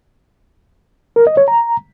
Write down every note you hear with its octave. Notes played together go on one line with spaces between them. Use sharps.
A#4
D#5
C#5
A#5